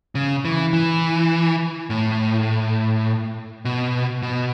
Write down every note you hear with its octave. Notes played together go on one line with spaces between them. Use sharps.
C#3
E3
E3
A2
B2
B2